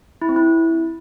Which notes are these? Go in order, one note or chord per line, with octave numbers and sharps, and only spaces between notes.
E4
C4
E4